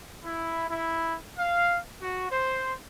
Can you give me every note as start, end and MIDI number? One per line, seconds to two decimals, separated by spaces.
0.24 0.65 64
0.68 1.14 64
1.37 1.78 77
2.00 2.26 66
2.30 2.72 72